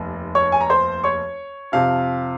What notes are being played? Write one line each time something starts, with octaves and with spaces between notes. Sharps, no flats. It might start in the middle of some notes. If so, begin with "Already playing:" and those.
Already playing: F1 D#2
C#5 C#6
G#5
A#5
C5 C6
C#5 C#6
F2 C3 F3 C4 F5